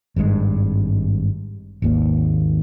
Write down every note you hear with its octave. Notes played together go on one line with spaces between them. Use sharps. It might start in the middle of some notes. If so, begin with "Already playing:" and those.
G#1 G2 D3 G#3
G#1 D#2 A#3